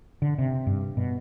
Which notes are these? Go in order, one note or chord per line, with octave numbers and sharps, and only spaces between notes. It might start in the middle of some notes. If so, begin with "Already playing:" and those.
D3
C3
G2
B2